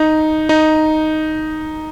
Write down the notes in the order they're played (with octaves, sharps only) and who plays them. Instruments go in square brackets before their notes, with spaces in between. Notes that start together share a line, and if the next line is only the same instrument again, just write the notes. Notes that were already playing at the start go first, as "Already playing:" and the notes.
Already playing: [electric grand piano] D#4
D#4